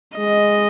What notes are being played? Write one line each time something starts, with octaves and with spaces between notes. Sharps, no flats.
G#3 D#5